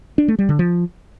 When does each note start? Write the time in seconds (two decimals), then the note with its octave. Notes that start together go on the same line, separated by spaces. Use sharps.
0.18 D4
0.28 A3
0.39 G3
0.49 D3
0.59 F3